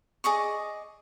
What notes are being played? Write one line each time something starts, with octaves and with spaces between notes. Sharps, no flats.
G#4 D5 D#5 C#6